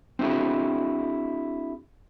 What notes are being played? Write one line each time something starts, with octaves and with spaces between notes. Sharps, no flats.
C4 D4 E4 F#4 G#4